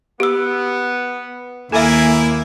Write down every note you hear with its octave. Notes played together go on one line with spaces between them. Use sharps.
B3 G4 E6
D#2 A#3 E4 A4 E5 G#5